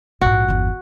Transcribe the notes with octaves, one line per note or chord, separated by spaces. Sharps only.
A#1 G#2 F#4
G1 E2